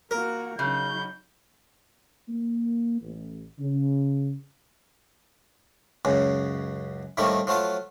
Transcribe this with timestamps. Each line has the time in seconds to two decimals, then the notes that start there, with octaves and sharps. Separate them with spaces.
0.11 A#3 F#4 A#4
0.59 C#3 F#3 D#4 G6
2.29 A#3
3.01 A1
3.59 C#3
6.05 C#2 F#2 C#3
7.17 A2 D#3 G3 A3 A#3 C4
7.47 F3 F#3 A3 F4 A5